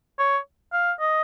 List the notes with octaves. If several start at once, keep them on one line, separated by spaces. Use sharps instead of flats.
C#5
F5
D#5